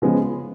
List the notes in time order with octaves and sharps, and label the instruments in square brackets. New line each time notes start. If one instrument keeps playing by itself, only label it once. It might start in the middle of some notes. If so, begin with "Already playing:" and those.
[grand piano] C#3 F3 G#3 B3